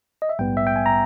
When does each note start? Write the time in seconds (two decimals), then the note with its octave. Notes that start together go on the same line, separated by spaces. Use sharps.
0.22 D#5
0.29 E5
0.39 A#1 G#2 G3 B3 G5
0.57 E5
0.67 G5
0.76 G#5
0.86 A#5